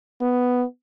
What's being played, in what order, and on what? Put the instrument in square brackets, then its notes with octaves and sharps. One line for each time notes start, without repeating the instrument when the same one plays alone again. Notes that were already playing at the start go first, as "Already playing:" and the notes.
[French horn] B3